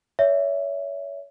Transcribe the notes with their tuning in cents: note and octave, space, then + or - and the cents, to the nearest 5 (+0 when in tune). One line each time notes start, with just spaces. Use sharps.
C#5 +30 E5 +0